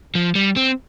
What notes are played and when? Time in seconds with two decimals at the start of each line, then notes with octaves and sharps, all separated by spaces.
0.15 F3
0.35 G3
0.57 C4